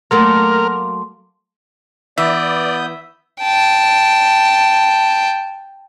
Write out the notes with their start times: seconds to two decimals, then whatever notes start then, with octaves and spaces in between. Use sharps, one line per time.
0.11 F#3 A3 A#3 A#4 C6
2.18 E3 B3 D5 E5 D#6 G6
3.42 G5 A5